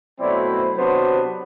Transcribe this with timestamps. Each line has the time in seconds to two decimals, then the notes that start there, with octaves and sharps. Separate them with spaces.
0.19 B2 F#3 A3 C4 E4 D5
0.49 C5
0.77 C3 F#3 B3 D4 C5